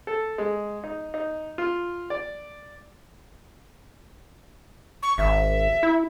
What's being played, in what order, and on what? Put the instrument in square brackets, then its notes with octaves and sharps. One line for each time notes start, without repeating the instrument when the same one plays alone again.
[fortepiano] A4
G#3
D#4
D#4
F4
D5
[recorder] C#6
[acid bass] G#1 [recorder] E5
[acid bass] E4